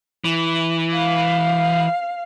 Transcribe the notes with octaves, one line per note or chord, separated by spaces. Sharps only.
E3
F5